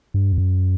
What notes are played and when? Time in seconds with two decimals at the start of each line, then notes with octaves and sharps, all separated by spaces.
0.14 G2
0.32 F2
0.38 F#2